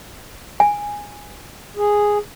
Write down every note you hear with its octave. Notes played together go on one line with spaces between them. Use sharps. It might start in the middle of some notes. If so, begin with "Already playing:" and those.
G#5
G#4